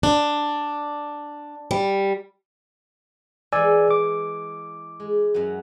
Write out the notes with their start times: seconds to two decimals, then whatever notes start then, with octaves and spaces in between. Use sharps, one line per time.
0.03 D4
1.71 G3
3.53 E3 G#3 D5 G#5 E6
3.91 D6
5.00 G#3
5.34 F#2 F#3